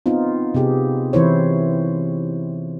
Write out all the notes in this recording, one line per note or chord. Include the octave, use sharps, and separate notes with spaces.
B3 C4 D#4 F4
C3 B3 G4 G#4
E3 C4 E4 C5 C#5